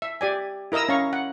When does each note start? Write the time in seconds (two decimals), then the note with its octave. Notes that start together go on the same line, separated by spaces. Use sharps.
0.02 E5
0.21 G4 D5 G#5
0.72 E4 A#4 D#5 A#5 E6
0.89 C#4 F5 C#6
1.13 F#5